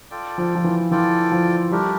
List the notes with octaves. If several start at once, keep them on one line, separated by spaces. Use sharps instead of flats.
F4 A4 D5 G5
F3
F3
E3
E3 F4 A4 D5 G5
F3
G3 A3 D4 G4 A#4